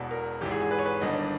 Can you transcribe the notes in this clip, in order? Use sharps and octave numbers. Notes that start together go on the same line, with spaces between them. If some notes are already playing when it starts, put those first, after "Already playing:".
Already playing: E1 E2 B2
A#4
G#1 G#2 E3 G4
G#4
G#4
B4
C#5
B4
G1 G2 D#3 D#5